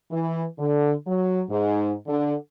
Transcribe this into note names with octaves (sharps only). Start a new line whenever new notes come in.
E3
D3
F#3
G#2
D3